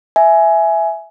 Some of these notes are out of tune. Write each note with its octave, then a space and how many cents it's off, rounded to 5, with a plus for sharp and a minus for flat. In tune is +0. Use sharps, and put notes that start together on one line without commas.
E5 +0 G#5 +15